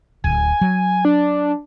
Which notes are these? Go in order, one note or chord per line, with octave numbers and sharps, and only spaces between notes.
D1 G#5
F#3
D4